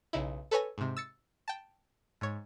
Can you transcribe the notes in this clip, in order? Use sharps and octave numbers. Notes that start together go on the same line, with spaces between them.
B1 C#3 D#4 E4
A4 B4 C#5 G#5 A#6
G#2 C3
E6 A6 C#7
G5 A5
G#2 C#5